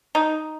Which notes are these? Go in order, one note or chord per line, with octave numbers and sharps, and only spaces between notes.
D#4